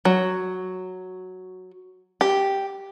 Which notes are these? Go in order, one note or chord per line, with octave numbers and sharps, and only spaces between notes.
F#3
G4